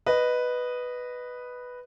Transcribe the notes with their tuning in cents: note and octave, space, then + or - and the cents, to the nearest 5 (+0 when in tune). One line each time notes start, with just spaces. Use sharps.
B4 +0 D#5 -10